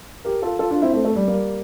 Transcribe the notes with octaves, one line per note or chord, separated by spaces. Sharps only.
G4 A#4
F4 A4
F4 A4
D4 F4
C4 E4
A3 C4
A3
G3
G3 A#3